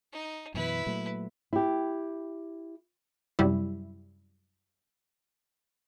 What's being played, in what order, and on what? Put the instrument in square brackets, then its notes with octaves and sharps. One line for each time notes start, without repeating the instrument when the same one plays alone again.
[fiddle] D#4
[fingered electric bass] F#2 B2 E3 [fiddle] E4 B4
[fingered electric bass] A#2 F#3 A3
[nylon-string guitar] E4 G4
[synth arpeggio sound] F#2 C3 G3 E4